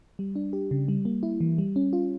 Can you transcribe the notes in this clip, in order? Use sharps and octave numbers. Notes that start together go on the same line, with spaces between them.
G3
D4
G4
C#3
G3
A#3
E4
E3
G3
C#4
F4